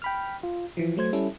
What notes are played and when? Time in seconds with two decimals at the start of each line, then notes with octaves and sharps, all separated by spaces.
0.02 G5 B5 F6
0.43 F4
0.77 E3 F3
0.97 F#3 A3 C5 G#6
1.13 G3 C#4 E4 A4